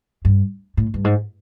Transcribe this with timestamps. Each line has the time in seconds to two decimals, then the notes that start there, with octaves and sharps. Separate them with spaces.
0.25 G2
0.77 A2
0.94 G2
1.05 G#2